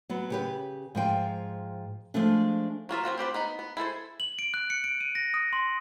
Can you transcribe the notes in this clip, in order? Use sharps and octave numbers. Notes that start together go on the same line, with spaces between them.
F#3 B3
C#3 G4 B4
G#2 F3 G5
F3 G#3 A3 D4
F#3 A#3 F4 E5
C4 C#4 F4 F#4
C4 G4 B4 C5
B3 D#4 B5
B3
E4 G#4 A4 C5
F#7
D7
F#6
C#7
D7
D#7
A#6
D#6
C6